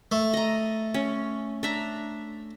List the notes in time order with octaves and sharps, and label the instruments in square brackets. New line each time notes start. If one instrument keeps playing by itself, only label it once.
[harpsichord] A3
[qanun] D#5 A#5
C#4
D4 E5 A#5